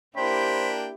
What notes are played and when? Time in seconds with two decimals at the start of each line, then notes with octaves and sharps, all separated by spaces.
0.16 A#3 D4 E4 G4 C5 G5 B5